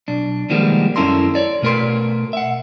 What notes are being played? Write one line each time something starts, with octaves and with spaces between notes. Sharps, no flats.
B1 D4
D#3 F3 G3 G#3 A#3 B3
F#2 C#4 E4 A4 A#4 C6
C#5 D5
B2 A3 A#4 B4 C6
E5 F#5